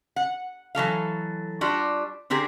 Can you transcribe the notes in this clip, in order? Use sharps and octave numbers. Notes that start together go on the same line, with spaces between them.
F#5
E3 F#3 A4 F5
G3 D4 F4 F#4
D3 C4 G4 G#4 A#4